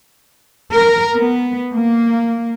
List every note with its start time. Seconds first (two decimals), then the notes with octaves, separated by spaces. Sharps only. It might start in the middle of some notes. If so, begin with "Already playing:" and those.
0.73 A#4
1.15 B3
1.74 A#3